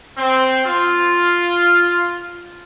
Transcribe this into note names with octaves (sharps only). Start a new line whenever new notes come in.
C4
F4